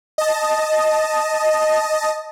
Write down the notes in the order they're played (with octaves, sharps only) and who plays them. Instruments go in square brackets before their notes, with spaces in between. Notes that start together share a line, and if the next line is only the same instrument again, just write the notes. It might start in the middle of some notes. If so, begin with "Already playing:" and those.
[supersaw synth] D#5 A5